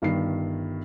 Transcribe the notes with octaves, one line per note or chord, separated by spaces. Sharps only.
G1 G2 D#3 C7